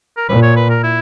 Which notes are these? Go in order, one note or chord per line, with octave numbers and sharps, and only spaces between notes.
A#4
A#2 B4
C#5
B4
A#4
E4